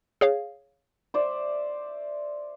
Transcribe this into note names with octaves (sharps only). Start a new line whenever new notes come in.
G#4 C#5 F5
C5 D5 E5